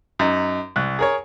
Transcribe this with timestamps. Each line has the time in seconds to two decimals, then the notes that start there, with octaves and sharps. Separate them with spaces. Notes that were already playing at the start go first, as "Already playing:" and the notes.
0.19 F#2 D#4
0.76 C2 F#6
0.99 G#4 A#4 C#5